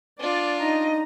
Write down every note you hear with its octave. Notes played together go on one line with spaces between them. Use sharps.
D4 F4 D5
D#4 D#5 A#5